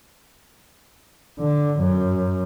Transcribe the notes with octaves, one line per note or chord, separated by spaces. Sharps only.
D3
F#2